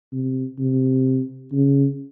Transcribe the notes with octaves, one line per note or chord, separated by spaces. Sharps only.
C3
C3
C#3